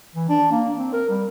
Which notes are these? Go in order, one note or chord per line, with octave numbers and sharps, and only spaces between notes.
E3
D4
A#3
C4
A#4
G3